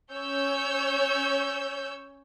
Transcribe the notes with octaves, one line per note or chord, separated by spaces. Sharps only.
C#4 C#5 E6 G6